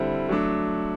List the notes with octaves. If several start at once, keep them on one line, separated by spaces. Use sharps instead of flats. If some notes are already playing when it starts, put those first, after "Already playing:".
Already playing: D3 G3 C4 E4
F#3 A3 D4